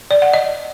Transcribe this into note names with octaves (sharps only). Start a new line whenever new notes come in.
D5
F#5
D#5